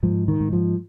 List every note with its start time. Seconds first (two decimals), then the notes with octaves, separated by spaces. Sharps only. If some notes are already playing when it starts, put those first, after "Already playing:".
0.03 G#2 F3
0.28 D#3
0.41 G#2
0.53 F3